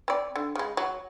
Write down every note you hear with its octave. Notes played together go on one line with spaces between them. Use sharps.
C4 D5
D3
C#3 G#3
F#3